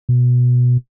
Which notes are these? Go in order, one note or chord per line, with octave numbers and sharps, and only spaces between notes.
B2